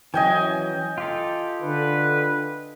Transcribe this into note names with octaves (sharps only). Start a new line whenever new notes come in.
E3 F#3 C#4 D#5 G5 G#5
F4 G4 A4
D3 B4